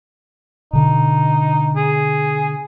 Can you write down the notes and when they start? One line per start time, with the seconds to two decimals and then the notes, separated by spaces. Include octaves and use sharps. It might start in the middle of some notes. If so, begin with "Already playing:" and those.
0.73 B2 D3 D#4
1.76 G#4